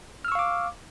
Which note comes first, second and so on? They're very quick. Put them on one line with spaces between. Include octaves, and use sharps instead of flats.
F6 E6 C#6 F5 D6